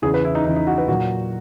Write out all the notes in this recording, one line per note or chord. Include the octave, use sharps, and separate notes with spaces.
E2 C#3 E3 G#4
B4
E4
D#4
E2 C#3 E3 D#4
D#4
F#4
B4
A#2 F#3 F#4